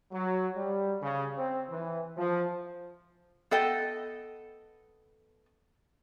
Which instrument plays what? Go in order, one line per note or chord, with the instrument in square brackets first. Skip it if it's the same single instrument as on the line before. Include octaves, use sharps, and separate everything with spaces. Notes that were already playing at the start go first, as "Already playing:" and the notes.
[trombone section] F#3
G3
C#3
C4
E3
F3
[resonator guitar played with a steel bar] B3 A4 D#5 G5